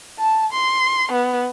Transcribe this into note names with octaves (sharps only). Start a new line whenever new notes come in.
A5
C6
B3